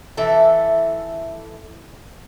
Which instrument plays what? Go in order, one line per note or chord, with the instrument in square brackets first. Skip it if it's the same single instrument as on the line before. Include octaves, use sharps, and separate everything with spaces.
[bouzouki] E3 A4 E5